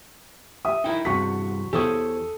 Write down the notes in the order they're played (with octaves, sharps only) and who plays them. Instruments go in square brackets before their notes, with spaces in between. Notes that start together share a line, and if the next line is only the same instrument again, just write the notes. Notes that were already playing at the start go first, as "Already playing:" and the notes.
[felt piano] G4 [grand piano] E5 D#6
[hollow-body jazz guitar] D#4 E4 A#4 [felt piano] G5
[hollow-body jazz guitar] E2 G2 C3 [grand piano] F#4 [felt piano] C#6 B6
[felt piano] E2 [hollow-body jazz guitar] G4 C5 C#5 [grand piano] A4 D#6